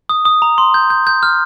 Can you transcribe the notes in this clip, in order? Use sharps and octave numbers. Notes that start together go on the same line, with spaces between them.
D#6
D#6
A#5
C6
G6
G6
G6
F6